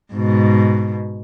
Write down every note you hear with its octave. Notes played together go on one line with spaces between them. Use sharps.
G#2 B2